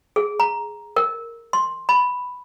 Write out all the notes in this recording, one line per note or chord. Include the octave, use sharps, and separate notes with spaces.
G#4
A#5
A#4
C6
B5